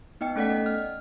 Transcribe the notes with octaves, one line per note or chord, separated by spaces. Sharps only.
B3 D#4 D#5 G5 C#7
A3 C#4 A4 D5 F#5 B6
D#5
F6